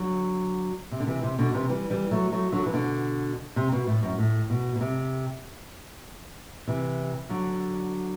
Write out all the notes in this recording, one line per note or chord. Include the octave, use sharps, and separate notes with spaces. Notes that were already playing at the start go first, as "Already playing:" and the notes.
Already playing: D3 F#3
C3
D3
C3 E3
C3
B2 D3
C3 E3
E3 G3
E3 G3
F#3 A3
F#3 A3
D3 F#3
E3
B2 D3
C3
B2
A2
F#2
A2
B2
B2
C3
C3 E3
D3 F#3